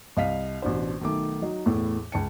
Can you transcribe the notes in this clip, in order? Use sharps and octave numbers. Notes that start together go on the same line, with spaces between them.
C2 D#5 F5 B6
A1 B2 D4 C5
B1 D#3 A3 D6
F#3 D#4
E2 A2 A3
C#2 A5 C#7